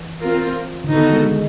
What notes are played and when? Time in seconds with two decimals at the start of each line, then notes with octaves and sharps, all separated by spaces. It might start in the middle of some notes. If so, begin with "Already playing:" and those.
Already playing: E3
0.21 C4 F4 A#4
0.84 D3
0.89 D#3 B3 D#4 F#4 A4
1.13 G#3
1.25 G#3